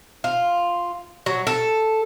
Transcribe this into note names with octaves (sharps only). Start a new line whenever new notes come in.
F4
F#3
A4